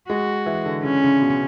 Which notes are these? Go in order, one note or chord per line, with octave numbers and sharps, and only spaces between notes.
G#3 F#4
E3
D3
C#3 C#4
C#3
B2